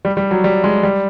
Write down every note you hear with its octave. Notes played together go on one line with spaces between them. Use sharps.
G3
G3
F#3
G3
G#3
G3